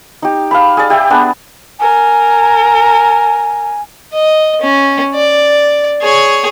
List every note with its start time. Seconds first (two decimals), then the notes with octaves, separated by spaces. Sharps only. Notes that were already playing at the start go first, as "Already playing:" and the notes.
0.22 D#4 G4
0.51 F5 A5 B5
0.77 G#4 D5
0.90 G4 E5 G5
1.10 B3 D4 G#4
1.80 A#4 G#5
4.13 D#5
4.62 C#4
5.15 D5
6.02 G#4 C#5